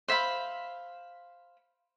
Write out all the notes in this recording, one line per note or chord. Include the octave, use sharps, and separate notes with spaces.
C5 E5 F5 B5